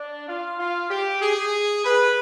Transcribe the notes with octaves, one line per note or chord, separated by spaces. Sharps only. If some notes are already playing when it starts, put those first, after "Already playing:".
Already playing: D4
F4
F4
G4
G#4
B4